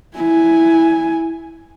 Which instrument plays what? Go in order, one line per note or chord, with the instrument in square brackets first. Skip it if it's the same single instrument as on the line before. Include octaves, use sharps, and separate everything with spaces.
[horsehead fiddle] E4 G#5